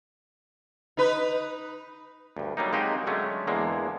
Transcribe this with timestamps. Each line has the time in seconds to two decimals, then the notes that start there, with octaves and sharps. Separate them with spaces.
0.97 D#4 B4
2.37 D2 G2
2.57 F#3 G3 A#3 D#4
2.73 G#3 A#3 C4 D#4 F#4 G4
3.07 D3 F#3 G#3 A3 C#4
3.47 E2 D3 G#3 A#3